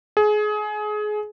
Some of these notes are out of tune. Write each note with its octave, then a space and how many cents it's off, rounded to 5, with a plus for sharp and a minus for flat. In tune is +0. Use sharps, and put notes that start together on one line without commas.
G#4 +25